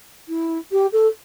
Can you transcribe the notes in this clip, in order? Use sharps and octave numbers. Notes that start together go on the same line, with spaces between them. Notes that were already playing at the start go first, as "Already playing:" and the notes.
E4
G4
A4